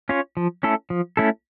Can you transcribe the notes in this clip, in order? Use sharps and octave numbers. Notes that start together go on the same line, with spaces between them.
C#4 F4 C#5
F3
A3 C#4 E4 A4
F3
A3 C#4 E4 A4